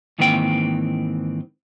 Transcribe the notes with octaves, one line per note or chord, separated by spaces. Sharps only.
G#2 D#3 E3 A#3 C4 G5